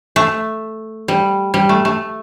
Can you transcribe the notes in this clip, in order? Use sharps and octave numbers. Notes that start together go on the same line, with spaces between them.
A3
G3
G3
A3
A3